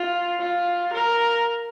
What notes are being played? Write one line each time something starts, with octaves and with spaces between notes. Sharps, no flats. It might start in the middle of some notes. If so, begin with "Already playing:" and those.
Already playing: F4
F4
A#4